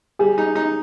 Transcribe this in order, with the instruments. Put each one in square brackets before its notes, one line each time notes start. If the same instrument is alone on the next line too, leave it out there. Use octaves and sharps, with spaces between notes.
[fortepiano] G3 [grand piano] G#4
[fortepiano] D#4
D#4